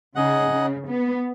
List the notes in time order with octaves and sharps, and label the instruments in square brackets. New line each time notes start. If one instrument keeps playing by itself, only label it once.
[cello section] C#3 [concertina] D#4 G#4 D#5 F#5
[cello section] C#3
B3